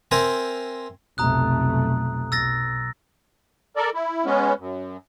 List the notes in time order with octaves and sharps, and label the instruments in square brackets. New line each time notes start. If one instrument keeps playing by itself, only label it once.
[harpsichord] C4 A#4 C5 E5 G#5 A#5
[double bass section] F1 B1 A3 [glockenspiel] A#5 D#6 F#6
[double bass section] B1 [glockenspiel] E6 A6 A#6
[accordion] A4 A#4 D5
E4
G#3 B3 C#4
F#2